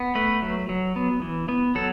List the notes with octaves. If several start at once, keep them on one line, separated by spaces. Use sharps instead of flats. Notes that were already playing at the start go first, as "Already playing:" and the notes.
Already playing: B3
A3 B4
F#3
F#3
B3
E3
B3
F#3 A4